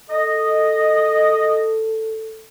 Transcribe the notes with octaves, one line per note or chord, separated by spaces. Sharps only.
A4 D#5